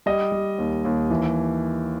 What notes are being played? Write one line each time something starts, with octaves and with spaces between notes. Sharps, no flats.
G3 D#5
G3
D#2
D#2
E3